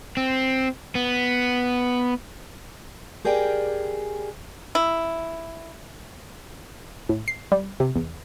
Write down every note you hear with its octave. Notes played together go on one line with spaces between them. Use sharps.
C4
B3
G4 G#4 A#4 D5 G5 G#5
E4
A2
C7
G3
C3
E2